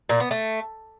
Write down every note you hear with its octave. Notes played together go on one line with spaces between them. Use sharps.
A#2
B3
A3